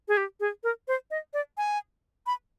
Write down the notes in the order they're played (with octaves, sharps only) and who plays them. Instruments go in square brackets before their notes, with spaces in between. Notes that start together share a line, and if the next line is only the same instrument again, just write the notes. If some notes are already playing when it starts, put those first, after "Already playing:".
[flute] G#4
G4
G#4
A#4
C5
D#5
D5
G#5
B5